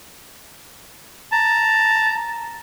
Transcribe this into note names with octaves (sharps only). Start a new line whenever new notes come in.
A5 A#5